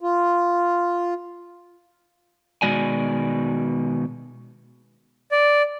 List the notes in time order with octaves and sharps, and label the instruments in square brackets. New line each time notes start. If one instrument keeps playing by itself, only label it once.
[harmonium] F4
[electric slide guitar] B2 D#3 G#3 F#4 D5 G#5
[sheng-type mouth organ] D5